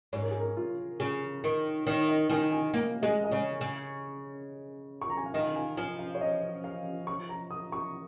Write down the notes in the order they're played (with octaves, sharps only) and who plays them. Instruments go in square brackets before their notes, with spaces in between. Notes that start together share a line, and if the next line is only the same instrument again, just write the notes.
[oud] G#2 [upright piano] C#5
[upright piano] A#4
G#4
A#4
F4
[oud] C#3 [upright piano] G#4
[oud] D#3
[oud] D#3 [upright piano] C#5
[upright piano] D#5
[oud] D#3 [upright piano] G#5
[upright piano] G#5
[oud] A#3 [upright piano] F5
[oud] G#3 [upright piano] D#5
[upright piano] D#5
[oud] C#3 [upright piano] C#5
[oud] C#3
[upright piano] C#6
A#5
G#5
F5
[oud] D#3 [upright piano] D#5
[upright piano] F5
G#5
[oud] F3 [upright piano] G#5
[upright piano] F5
C#5
D#5
F5
C#6
A#5
D#6
C#6